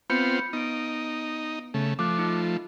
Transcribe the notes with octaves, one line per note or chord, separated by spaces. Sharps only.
B3 C4 F4 B5 G6 C#7
B3 D#4 D7
C#3 A3
F3 A3 D6 F#6
D#4 F4